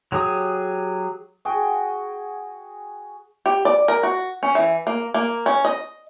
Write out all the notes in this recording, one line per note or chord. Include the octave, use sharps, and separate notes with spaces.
F#3 G4 G#4 D#6
F#4 G#4 G5
G4
D5
A#4
F#4
C#4
E3
A#3
A#3
C#4
D#5